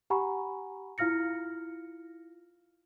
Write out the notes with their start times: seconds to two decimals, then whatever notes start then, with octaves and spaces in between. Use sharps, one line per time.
0.10 G4 F#5 G#5 A#5 B5 C#6
0.98 E4 F4 F5 F6 A#6 C#7